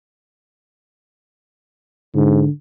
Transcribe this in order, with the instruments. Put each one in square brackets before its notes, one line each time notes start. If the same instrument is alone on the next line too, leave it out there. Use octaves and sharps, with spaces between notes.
[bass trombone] G#2 [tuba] D3